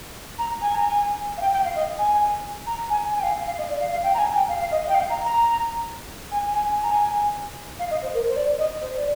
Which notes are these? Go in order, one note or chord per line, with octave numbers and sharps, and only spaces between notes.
A#5
G#5
A#5
G#5
F5
G5
G5
F5
D#5
G#5
A#5
G#5
G#5
G5
F5
F5
D#5
D5
F5
F5
G5
A#5
G#5
G5
F5
F5
D#5
D#5
G5
F5
A#5
A#5
G#5
G#5
G#5
A#5
G#5
F5
D#5
C5
A#4
C5
D5
D#5
C5
D5